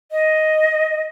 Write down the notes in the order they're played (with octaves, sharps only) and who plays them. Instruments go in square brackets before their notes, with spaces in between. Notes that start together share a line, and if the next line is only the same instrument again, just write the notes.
[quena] D#5